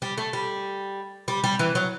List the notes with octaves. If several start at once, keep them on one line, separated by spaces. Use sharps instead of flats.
G3
A3
G3
G3
G3
E3
F#3